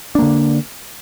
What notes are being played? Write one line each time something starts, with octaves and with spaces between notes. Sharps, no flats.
D3 A#3 D4